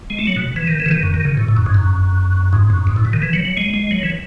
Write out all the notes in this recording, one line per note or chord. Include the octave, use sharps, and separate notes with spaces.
G#3
A3
F#3
B2
E3
D#3
E3
C#3
D#3
F#2
D#3
C#3
A2
A2
F#2
G#2
F#2
G#2
F#2
G#2
A2
B2
D#3
E3
F#3
F#3
G#3
G#3
F#3
E3